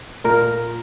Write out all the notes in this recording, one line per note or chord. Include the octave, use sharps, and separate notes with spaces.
A#2 A#4